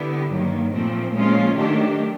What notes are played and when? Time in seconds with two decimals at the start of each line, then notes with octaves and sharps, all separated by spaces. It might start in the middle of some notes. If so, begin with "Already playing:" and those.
Already playing: D3 G3 B3 E4 G4
0.31 G2 D#3 F#3 A#3
0.73 A#2 F3 A3 C4
1.15 A#2 F3 G#3 C#4 F4
1.57 D#3 F#3 A3 D4 G4